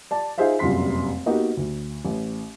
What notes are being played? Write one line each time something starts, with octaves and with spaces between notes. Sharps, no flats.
D5 A5
D#4 F4 G#4 C5 E5 F5
F1 A#1 F#2 G3 C6 B6
A#3 B3 D#4 F#4 G4 A#4
D2
A1